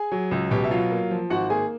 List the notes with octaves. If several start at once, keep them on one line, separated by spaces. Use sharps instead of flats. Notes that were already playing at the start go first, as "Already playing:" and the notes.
Already playing: G#4 G#5
F#3
C#2
B2 G4 G5
E5
F#3 F4 F5
A#3
F3
G#1 F#4 F#5
A#3 G#4 G#5